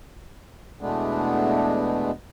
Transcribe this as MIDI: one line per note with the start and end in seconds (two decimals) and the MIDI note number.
0.81 2.11 40
0.81 2.11 47
0.81 2.11 56
0.81 2.11 57
0.81 2.11 59
0.81 2.11 62